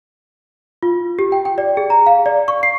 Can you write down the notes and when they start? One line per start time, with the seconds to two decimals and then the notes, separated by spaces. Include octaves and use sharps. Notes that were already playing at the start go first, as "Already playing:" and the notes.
0.83 F4
1.19 G4
1.32 G5
1.45 G5
1.58 D5
1.77 G#4
1.90 A#5
2.06 F5
2.26 D5
2.48 C#6
2.63 C7